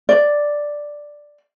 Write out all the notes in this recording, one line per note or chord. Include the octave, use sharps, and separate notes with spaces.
D5